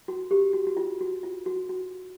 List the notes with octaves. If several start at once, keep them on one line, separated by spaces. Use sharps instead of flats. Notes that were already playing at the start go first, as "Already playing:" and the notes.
F#4
G4
F#4
F#4
F4
F#4
F4
F#4
F#4